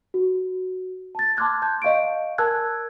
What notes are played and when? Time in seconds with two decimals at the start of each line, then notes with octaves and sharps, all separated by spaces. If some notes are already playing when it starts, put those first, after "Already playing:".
0.14 F#4
1.15 A5 A6
1.37 A5 C6 D6 F6 F#6 G#6
1.62 A5 G6
1.82 D#5 F5 C#6 D7
2.38 A#4 G#5 A5 E6 F#6 G#6